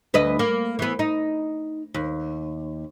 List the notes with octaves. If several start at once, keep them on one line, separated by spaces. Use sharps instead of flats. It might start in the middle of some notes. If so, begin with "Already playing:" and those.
D2 B4 D#5
A#3
E3 B3
D#4
D#2